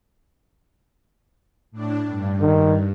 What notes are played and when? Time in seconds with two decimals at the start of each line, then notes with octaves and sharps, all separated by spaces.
1.71 A2 D4
2.07 G2
2.41 D#3